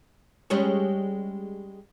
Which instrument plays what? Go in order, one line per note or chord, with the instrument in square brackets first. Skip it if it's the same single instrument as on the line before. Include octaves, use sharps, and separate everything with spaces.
[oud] G3 G#3 C#4